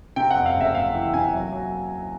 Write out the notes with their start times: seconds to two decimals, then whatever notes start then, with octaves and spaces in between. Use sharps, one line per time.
0.16 C3 G5
0.31 F2 F#5
0.46 F5
0.55 F#1
0.61 E5
0.75 F#1 F5
0.94 E3
1.14 C3 G#5
1.34 F#3
1.52 F#3